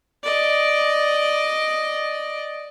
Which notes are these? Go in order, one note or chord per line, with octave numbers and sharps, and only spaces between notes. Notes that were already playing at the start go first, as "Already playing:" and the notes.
D5 D#5